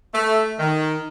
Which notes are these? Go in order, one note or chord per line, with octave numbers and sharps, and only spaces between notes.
A3
D#3